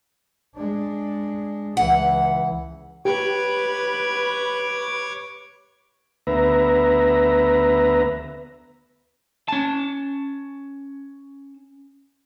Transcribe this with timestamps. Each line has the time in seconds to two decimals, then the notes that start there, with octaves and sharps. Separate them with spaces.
0.55 G#3 D4
1.77 C#2 E3 F#5
3.05 G4 B4 C#5 D6 G#6
6.27 D2 B3 B4 E5 A#5
9.48 C#4 A5